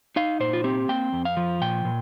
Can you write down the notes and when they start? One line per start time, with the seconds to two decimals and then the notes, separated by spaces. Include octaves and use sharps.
0.16 D#4 F5
0.40 A#2 C5
0.53 F4
0.64 C4 G4
0.89 A#3 G5
1.12 F2
1.25 F5
1.37 F3
1.61 A#2 G5
1.85 A#2